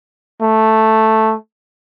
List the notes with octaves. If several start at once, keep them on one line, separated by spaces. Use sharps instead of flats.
A3